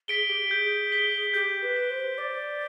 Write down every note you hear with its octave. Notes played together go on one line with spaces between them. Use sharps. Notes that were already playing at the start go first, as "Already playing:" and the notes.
G#4 B6 D7 G7
G4
G#4 G6
B6 D7 G7
G4 G6
B4
B6 D7 G7
C5
D5 D6